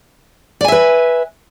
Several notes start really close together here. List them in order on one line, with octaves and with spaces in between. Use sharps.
D5 G#5 E5 B4